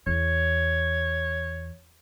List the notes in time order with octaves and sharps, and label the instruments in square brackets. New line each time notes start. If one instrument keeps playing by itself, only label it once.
[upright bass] E2 [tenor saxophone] C#5